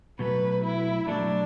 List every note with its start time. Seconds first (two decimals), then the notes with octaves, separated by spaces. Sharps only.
0.19 B2 F#3 A3 B4
0.64 E4
1.08 B2 F#3 A3 D4